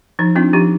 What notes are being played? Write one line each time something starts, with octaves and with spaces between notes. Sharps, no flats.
F3 D#4
C4 D4 F4
F3 D#4 G4